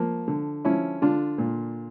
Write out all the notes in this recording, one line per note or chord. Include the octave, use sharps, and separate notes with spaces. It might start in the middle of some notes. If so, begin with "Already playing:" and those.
Already playing: F3 A#3
D3
F3 C#4 E4
D3 D4 F4
A#2